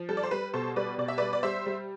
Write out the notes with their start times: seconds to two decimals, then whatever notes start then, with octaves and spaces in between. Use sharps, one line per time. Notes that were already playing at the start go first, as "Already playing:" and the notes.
Already playing: F3
0.09 G3 A4
0.17 D5
0.23 C5
0.31 G3 B4
0.53 B2 A4 C5
0.76 G3 B4 D5
0.98 B2 D5
1.08 E5
1.18 G3 B4 D5
1.33 D5
1.43 G3 C5 E5
1.66 G3